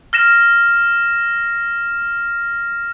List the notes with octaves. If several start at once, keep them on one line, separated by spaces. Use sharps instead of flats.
F6 A#6 E7